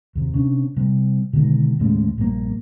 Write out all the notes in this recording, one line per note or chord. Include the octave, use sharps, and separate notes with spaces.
D#2 C3
C3 C#4 D4
C3 G3
B2 D3 D#3 G#3
D#2 A2 C#3 G#3
A#1 G2 A#3